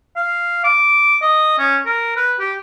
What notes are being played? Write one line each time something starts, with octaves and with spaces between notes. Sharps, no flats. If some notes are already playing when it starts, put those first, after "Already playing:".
F5
D6
D#5
C#4
A#4
B4
G4